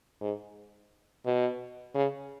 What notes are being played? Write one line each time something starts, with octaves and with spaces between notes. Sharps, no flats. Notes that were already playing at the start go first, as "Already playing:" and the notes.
G#2
B2
C#3